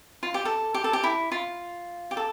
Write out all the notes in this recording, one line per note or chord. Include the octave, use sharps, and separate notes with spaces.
F4
G4
A4
G4
A4
G4
E4
F4
G4
A4